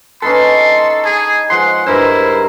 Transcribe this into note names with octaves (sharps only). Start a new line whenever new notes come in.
C#4 D#4 A4 B4 C6
G#4
F3 G#3 F#5 C6
G2 E4 A#4 C5 A#5